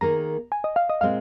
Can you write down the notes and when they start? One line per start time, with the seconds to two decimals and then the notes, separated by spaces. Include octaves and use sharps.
0.01 D#3 A#3 G#4 A#5
0.52 G#5
0.64 D#5
0.76 F5
0.89 D#5
1.01 A#2 G#3 C4 F5